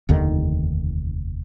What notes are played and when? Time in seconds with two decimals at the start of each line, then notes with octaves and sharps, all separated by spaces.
0.09 F1 D#2 D3 D#3